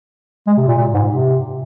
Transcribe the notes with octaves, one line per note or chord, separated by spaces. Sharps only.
G#3
C3
A#2
A#2
G#2
C3